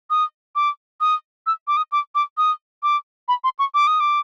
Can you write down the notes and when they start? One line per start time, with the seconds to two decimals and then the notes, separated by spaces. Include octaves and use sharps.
0.10 D#6
0.56 D6
1.01 D#6
1.47 E6
1.68 D6
1.77 D#6
1.92 D6
2.15 D6
2.38 D#6
2.83 D6
3.28 B5
3.44 C6
3.59 C#6
3.74 D6
3.87 D#6
4.00 D6